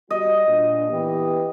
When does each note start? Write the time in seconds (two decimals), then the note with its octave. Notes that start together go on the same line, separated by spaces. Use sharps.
0.10 G3 F#4 D#5
0.48 A#2 D4
0.90 E3 B3 G4